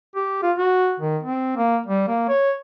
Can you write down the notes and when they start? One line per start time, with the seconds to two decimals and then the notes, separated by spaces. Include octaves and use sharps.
0.16 G4
0.43 F4
0.58 F#4
1.00 D#3
1.23 C4
1.57 A#3
1.86 G3
2.08 A#3
2.28 C#5